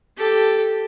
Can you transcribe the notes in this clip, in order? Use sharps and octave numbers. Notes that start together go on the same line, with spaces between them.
G4 A4